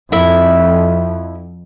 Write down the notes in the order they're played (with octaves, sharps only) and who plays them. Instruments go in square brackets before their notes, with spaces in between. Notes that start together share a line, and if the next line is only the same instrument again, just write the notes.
[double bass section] F2 [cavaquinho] E4 E5